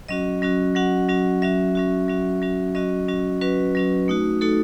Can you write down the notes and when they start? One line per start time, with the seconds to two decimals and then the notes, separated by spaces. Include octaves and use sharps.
0.08 F#3 C#4 F#4 D#5
0.42 F#3 C#4 F#4
0.75 F#3 C#4 F#4 F#5
1.09 F#3 C#4 F#4
1.42 F#3 C#4 F#4 E5
1.75 F#3 C#4 F#4
2.08 F#3 C#4 F#4
2.42 F#3 C#4 F#4
2.75 F#3 C#4 F#4 D#5
3.08 F#3 C#4 F#4
3.41 F#3 C#4 F#4 B4
3.75 F#3 C#4 F#4
4.08 A3 D#4 F#4
4.41 A3 D#4 F#4 A4